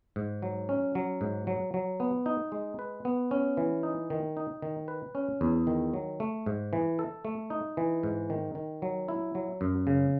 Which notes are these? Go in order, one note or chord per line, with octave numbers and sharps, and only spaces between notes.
G#2
F#3
C#4
F#3
G#2
F#3
F#3
B3
D#4
G#3
B4
B3
C#4
E3
D#4
D#3
D#4
D#3
B4
C#4
E2
D#3
F#3
A3
G#2
E3
A4
A3
D#4
E3
G#2
D#3
D#3
F#3
E4
F#3
F#2
C#3